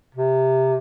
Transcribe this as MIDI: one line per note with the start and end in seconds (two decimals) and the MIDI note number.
0.15 0.78 48